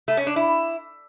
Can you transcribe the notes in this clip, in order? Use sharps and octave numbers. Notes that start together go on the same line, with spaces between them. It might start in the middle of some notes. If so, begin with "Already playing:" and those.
A3
C#4
D4
E4